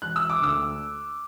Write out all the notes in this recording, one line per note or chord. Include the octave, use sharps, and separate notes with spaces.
E1 F#6
E6
D6
D2 D3 A3 E6